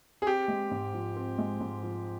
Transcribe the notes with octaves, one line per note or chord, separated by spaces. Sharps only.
G#4
C4 G4
G#3
G#2
F3
C4
G#3
G#2
F3